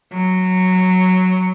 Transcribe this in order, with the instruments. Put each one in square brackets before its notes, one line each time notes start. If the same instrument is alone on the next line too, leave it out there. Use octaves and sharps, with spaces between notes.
[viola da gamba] F#3